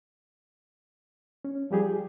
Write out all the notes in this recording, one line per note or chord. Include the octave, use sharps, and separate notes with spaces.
C#4
F3 G3 G4 G#4